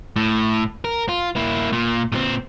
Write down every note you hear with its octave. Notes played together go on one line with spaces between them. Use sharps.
A2
A#4
F4
A#3 E4
A#2
A#2 C4